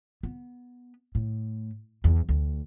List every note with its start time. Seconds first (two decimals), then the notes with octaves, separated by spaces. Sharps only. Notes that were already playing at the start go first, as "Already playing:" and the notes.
0.23 B3
1.15 A2
2.04 E2
2.29 D2